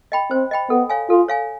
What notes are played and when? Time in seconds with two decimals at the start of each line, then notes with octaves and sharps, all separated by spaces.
0.12 D#5 G5 B5
0.31 C4 C5
0.51 D#5 G5 B5
0.70 B3 A4
0.90 C#5 F5 G#5
1.10 F4 A4
1.29 C#5 F5 G#5